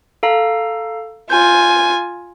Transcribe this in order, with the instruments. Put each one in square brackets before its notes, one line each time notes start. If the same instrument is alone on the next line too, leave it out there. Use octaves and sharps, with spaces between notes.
[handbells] A4 F5 A#5
[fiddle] F4 G#5 [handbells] G6